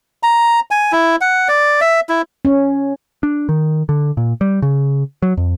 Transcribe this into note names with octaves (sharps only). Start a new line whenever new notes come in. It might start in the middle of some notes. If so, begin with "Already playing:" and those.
A#5
G#5
E4
F#5
D5
E5
E4
C#4
D4
D#3
D3
A#2
G3
C#3
F#3
F2